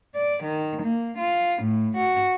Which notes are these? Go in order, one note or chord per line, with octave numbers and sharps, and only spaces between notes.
D5
D#3
A#3
F4
A2
F#4